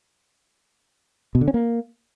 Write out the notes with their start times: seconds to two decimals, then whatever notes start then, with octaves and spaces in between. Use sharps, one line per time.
1.35 B2
1.41 D3
1.48 C#4
1.54 A#3